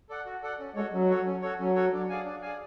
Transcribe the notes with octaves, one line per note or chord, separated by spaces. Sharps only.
A4 D5 F#5
F#4
A4 D5 F#5
C#4
G#3 F#4 A4 C#5
F#3 C#4
F#4 A4 C#5
C#4
F#4 A4 C#5
F#3 C#4
F#4 A4 C#5
D4
G#4 D5 F5 G#5
D4
G#4 D5 F5 G#5